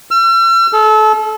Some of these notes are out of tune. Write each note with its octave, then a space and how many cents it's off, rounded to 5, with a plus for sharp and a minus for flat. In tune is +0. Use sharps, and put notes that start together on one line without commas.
E6 +45
A4 -30